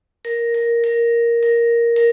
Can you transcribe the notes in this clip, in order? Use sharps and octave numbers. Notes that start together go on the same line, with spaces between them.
A#4
A#4
A#4
A#4
A#4